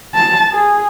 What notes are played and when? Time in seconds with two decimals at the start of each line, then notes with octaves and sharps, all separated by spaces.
0.15 A5
0.52 G#4